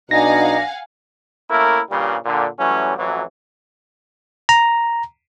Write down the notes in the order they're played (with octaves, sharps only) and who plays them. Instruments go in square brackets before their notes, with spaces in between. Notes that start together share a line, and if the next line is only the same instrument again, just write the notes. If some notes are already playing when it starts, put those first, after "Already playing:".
[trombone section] B1 B2 D4 [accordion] D#4 [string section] F5 F#5 G#5 [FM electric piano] A#6
[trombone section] A3 A#3 C#4 E4 A#4
G2 A#2 C#3 G3
A#2 D3
E3 F#3 G3 A3 C#4
A1 F2 E3 F#3
[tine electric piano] A#5